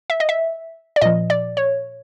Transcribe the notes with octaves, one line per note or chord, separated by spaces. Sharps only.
E5
D#5
E5
D5
A#2 F3 D#5
D5
C#5